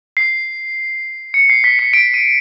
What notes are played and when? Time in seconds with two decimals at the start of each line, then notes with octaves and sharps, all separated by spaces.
0.17 C7
1.34 C#7
1.50 C7
1.64 B6
1.79 C#7
1.93 D7
2.14 D#7